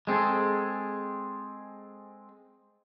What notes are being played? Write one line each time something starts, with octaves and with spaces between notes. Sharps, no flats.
G#3 C4 G#4 A4